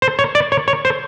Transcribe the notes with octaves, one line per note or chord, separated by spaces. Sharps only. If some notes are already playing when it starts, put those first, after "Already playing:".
C5
C#5
D5
C#5
C#5
C5